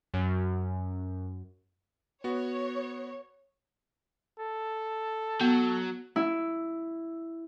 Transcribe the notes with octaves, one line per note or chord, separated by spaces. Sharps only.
F#2
B3 F#4 C#5
A4
F#3 B3
E4